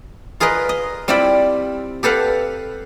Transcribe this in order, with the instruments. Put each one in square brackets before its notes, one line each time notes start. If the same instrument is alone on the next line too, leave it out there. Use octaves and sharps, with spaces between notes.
[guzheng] F4 G#4 A#4 B4 D#5
D#5
G3 C4 E4 F4 D5 B5
G4 A4 B4 F5 F#5